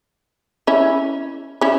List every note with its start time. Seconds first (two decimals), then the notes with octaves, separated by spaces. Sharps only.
0.67 C#4 E4
1.61 C#4 E4